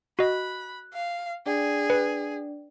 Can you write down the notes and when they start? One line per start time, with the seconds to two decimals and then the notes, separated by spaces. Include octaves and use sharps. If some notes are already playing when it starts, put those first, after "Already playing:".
0.19 F#4 D#5 B5 F#6
0.94 F5
1.46 D4 G#4 D5 G5
1.90 B4